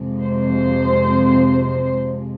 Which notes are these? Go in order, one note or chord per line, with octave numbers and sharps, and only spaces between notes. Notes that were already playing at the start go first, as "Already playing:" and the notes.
Already playing: F2 C3 F3 G#3
C5